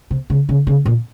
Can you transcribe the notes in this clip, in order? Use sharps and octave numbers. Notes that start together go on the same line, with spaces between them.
C3
C#3
C#3
C#3
A#2